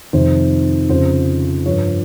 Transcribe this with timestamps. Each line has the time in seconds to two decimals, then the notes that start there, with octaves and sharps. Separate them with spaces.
0.13 F2 C3 D#3 C5
0.89 F2 C#3 F3 C5
1.66 G2 F3 C#5